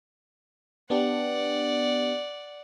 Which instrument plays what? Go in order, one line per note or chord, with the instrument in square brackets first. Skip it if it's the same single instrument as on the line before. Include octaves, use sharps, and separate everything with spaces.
[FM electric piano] B3 D4 G4 [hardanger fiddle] D5 F#5